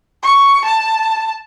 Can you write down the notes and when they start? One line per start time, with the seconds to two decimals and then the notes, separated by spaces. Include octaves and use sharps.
0.23 C#6
0.64 A5